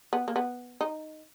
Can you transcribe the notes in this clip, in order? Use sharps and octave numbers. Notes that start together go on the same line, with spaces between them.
B3
A#3
B3
D#4